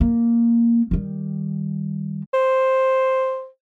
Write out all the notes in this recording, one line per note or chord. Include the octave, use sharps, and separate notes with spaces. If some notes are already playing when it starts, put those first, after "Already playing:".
A#3
D#3 G3
C5